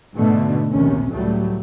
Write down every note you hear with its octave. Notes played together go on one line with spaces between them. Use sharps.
G#2 B2 D3 A3
A#1 D#2 C3 C#4
C#2 A2 F#3 G3 A3